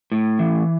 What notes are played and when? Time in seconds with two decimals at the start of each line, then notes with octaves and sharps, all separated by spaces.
0.12 A2
0.39 E3